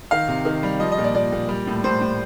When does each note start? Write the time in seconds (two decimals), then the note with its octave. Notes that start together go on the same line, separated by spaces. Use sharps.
0.11 D#3 F5
0.28 C3
0.45 D#3
0.63 G3
0.80 F3 D#5
0.92 D#5
0.98 A#2
1.04 D5
1.14 A#2 D5
1.32 A#2
1.49 G3
1.67 A2
1.84 A2 C5
2.01 A2